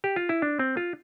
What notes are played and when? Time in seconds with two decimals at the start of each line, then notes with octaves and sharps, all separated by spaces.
0.04 G4
0.16 F4
0.29 E4
0.42 D4
0.59 C4
0.77 F4